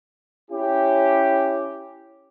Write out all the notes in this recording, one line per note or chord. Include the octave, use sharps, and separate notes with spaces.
C#4 E4 G4